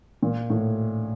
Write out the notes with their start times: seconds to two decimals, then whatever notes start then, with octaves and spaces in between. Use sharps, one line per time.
0.23 A#2
0.50 A2